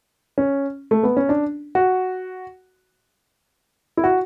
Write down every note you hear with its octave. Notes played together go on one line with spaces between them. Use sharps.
C#4
A3
B3
C#4
D4
F#4
E4
F#4